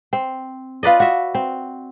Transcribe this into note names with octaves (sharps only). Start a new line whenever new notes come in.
C4
F4 B4 D5 D#5
F#4 E5
C4